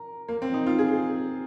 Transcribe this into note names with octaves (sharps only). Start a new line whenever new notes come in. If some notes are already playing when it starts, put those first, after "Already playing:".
Already playing: A#4
A#3
C4
D#4
F4
G#4